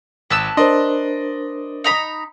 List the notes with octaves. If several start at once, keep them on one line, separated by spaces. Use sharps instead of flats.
G#1 B4 A5 E6 E7
D4 A#4 C5 D5 D#5 C6
D#4 A#5 B5